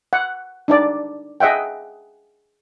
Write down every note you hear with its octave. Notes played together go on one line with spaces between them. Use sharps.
F#5
D4 D#4 D5
G#4 D#5 E5 F#5 G5